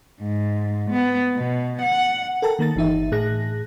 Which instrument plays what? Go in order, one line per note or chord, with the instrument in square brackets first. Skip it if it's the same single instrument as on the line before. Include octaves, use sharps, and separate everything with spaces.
[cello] G#2
B3
B2
F#5
[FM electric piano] A4 A#4 G5 A5 A#5
D#3 A#3 A#5 A6
G1 E3 D#4 E5
A2 G#4 F#6 A#6